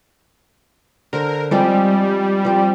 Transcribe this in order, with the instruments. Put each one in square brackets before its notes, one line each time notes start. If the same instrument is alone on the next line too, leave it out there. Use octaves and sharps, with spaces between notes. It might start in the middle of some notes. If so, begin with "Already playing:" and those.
[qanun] D3 C5 [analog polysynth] A#4
[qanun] F3 G#3 C4 [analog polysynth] G3
[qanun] F3 C4